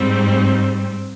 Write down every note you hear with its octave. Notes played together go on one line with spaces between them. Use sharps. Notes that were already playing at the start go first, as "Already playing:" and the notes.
Already playing: G#2 G3 C4